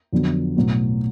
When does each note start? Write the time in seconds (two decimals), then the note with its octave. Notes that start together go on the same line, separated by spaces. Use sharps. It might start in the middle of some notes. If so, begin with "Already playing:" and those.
0.12 F2 D3 F#3 B3
0.56 B1 A2 F#3 B3 F#4